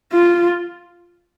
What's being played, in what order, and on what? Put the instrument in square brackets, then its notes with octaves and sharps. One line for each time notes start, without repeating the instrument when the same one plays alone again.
[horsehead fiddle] F4